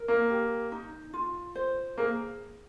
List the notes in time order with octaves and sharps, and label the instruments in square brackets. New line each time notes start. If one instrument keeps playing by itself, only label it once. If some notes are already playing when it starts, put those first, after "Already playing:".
Already playing: [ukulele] A#4
[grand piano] A#3
[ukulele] G4
D#4
F4
C5
[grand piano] A#3 [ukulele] G#4